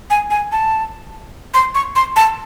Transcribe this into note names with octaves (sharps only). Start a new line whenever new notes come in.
G#5
G#5
A5
C6
C#6
C6
A5